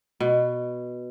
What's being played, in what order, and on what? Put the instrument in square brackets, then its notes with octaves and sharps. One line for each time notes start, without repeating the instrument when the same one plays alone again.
[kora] B2